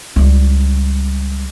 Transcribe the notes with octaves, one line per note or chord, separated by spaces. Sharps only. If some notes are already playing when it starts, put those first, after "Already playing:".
C#2 G3